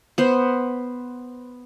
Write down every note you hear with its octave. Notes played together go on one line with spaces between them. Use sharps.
B3 C5